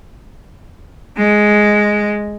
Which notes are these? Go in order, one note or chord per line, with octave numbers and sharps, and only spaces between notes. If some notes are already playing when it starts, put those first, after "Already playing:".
G#3